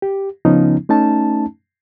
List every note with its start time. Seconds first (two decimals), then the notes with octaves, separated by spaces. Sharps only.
0.02 G4
0.45 C#3 F3 B3 C#4 D#4
0.89 A3 C#4 D#4 A5